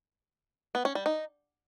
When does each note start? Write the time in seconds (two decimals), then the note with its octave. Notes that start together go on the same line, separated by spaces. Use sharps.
0.75 B3
0.85 C#4
0.95 G3
1.06 D#4